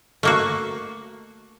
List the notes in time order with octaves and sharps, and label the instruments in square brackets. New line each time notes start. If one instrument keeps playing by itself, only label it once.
[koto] A3 A#3 F#4